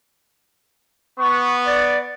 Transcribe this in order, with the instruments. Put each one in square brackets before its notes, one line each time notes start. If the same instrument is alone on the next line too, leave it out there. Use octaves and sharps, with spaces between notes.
[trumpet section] B3 [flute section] C#6
[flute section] D5